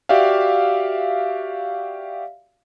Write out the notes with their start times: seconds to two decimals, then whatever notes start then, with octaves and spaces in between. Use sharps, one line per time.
0.09 F#4 G4 D5 E5 F5